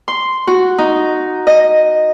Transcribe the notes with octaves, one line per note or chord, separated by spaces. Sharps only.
C6
F#4
D#4
D#5